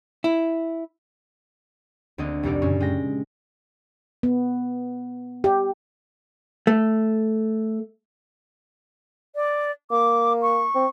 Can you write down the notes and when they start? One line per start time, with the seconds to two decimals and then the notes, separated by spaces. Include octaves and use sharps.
0.24 E4
2.18 D2 A#3 C4 D4 D#5 G#6
2.43 F1 C2 D#4 G4 A#4 D5
2.62 F#2 A#2 C#3 C#4
2.80 G#3 G5 A#6
4.23 B3
5.44 G4
6.67 A3
9.35 D5
9.91 A#3 D6
10.42 C#6
10.75 C4